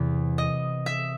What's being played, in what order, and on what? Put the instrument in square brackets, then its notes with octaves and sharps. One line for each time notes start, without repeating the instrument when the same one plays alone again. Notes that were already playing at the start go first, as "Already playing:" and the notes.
Already playing: [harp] E2 C3 E3
D#5
E5